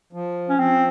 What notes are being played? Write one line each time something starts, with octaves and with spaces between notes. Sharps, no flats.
F3
C#4
F3 C4